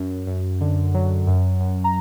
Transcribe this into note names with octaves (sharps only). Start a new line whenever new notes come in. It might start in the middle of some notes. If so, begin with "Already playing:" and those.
Already playing: F#2
F#2
D3
F#3
F#2
F#2
A#5